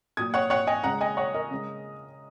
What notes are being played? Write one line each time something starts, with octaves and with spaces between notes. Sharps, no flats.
A#2 F#3 D#6 G#6
C#5 F#5
C#5 F#5
D#5 G#5
C#3 G#3 F#5 A#5
D#5 G#5
C#5 F#5
A#4 D#5
C#3 G#3